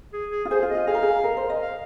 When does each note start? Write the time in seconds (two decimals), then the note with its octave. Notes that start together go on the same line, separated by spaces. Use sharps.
0.13 G#4
0.31 G#4
0.45 F4
0.51 G#4 C5
0.63 F4
0.69 D#5
0.75 F4
0.87 G#4 F5
0.95 A#4
1.02 G#4
1.24 A#4
1.37 C5
1.50 D#5
1.62 F5